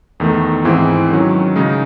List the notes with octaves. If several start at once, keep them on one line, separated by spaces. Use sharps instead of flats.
E2 D#3 A3
G#2 E3 C4 E4 G#4
D#3 F#3 C#4
C#3 G#3 D#4